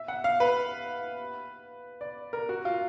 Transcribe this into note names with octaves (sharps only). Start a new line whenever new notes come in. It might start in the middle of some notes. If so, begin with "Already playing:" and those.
Already playing: E5
F#5
F5
B4
D5
A#4
F#4
F4